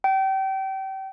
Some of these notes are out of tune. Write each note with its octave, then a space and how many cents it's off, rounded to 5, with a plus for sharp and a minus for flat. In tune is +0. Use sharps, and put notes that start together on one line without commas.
G5 -30